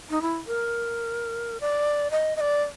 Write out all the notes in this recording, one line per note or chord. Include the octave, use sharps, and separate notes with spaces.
D#4
E4
A#4
D5
D#5
D#5
D5